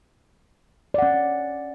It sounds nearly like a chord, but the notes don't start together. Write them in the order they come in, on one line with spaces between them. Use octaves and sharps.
D5 F#5 C#4